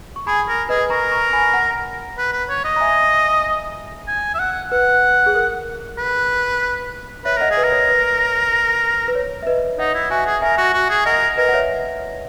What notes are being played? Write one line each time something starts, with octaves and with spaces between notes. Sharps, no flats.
C#6
G#4 G#5 B5
A#4
G#4 B4 D#5
A#4 A#5 C#6
A#5 C#6
G#5 B5
F#5 A#5
B4
B4
C#5
D#5
A#5
E5 G#5
G#5
E5
F#5
B4 F#5
G#4
A#4
B4
B4 C#5 E5
A#4 D#5 F#5
G#4
B4 D#5
A#4
C#5
B4
B4
C#5
E5
B4 D#5
D#4 D#5 F#5
E4
F#4 E5 G#5
G#4
A#4 E5 G#5
F#4
F#4
G#4
A#4 D#5 F#5
A#4 B4 D#5
F#5
C#5 E5